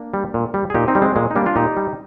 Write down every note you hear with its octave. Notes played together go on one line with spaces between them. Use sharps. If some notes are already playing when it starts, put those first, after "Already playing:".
Already playing: A#3 D4
G3
A#2
G3
G#4
A#2 D#4 G4
C4 D#4
G3
G#3 C4
A#2 G#3
D#4
G3 A#3 D4
D4 F4
A#2 D#4 G4
G3